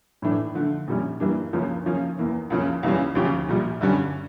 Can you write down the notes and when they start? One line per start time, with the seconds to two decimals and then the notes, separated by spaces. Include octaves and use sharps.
0.22 A2 E3 A3 D4
0.55 D3 F3 A3
0.87 A#1 A#2 G3 C#4
1.20 G2 E3 G3 A#3 D4
1.53 C#2 C#3 F3 A#3 C#4
1.86 C#3 F3 A#3 C#4
2.18 E2 E3 A#3
2.50 C#2 C#3 F3 A#3 C#4
2.83 C#2 C#3 E3 G3 C#4
3.15 D2 C#3 F3 C#4 G4
3.49 A#1 A#2 G3
3.81 G2 D3 G3 C#4